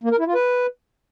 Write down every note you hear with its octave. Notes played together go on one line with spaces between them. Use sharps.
A#3
A#4
E4
F4
B4